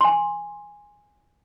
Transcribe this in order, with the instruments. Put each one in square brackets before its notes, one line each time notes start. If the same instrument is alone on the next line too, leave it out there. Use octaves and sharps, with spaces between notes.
[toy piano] G#5 C6